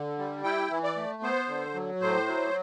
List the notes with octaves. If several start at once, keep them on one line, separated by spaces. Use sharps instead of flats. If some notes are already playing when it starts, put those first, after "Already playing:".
Already playing: D3
G3
E4 G5
E3
D5
A3
B3 C5
D3
F#3
A2 C5
F#3